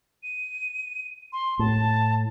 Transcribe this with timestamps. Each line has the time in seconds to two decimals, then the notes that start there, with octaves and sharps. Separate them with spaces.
0.23 D#7
1.33 C6
1.59 A2 A5